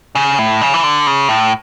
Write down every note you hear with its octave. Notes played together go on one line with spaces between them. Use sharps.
C#3
A2
C#3
E3
D3
C#3
A2